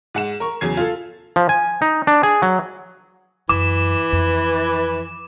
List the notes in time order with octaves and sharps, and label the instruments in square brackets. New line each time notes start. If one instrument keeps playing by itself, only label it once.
[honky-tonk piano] G#2 F#5 E7
A#4 C#6
E2 C#3 F#3 G#5 G#6 C7
F4 A4
[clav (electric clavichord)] F3
G#5
D#4
D4
G#4
F#3
[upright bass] F#2 [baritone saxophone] E3 [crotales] D6
[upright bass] F2 [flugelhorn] B4